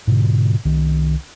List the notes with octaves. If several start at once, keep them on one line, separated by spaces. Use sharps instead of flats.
G#2 B2 D3
C2 D#3